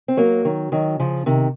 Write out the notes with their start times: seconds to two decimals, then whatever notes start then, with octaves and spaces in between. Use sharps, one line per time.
0.08 C4
0.17 F#3 A#3
0.45 D#3 F#3
0.72 D#3 F#3
0.99 C#3 F3
1.26 C3 D#3